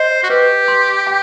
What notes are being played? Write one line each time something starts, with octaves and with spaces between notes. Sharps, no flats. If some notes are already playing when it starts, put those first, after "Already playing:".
Already playing: C5 D#5
F#4
G4 B4
C6
G5